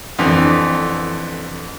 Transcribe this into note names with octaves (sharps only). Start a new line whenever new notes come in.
F2 D3 E3